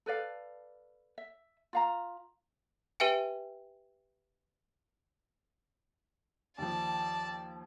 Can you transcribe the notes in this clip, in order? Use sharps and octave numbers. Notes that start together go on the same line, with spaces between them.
A4 B4 D5 F5
E5
F4 F5 A#5
G4 B4 E5 G5 G#5
D#2 F3 D5 A5